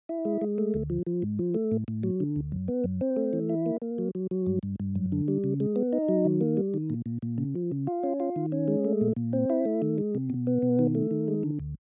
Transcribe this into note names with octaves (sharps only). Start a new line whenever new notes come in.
E4
G#3
G#3
A3
D2
F3
F3
G#2
F3
A3
A2
A2
F#3
D3
D2
F#2
B3
F#2
C4
A3
E3
E4
A#3
A#3
F#3
F#3
F#3
G2
G2
G2
F#2
D3
G3
C#3
G#3
B3
D#4
F#3
D#3
A#3
G3
D#3
A#2
A#2
A#2
C#3
F3
C#3
F4
C#4
F4
D#3
C#4
G#3
A3
A#2
A#2
C4
E4
A3
D#3
G#3
C3
B2
B3
B2
D#3
A3
D#3
G#3
D3
D2